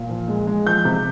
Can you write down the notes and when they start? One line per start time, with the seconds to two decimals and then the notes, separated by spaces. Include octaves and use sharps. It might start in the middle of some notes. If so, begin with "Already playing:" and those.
Already playing: A#2
0.09 F3
0.28 G#3
0.47 G#3
0.66 F3 G6
0.85 C3